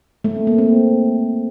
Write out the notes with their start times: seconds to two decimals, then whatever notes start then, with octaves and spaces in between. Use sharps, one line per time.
0.24 A3
0.36 C4
0.47 A#3
0.58 C4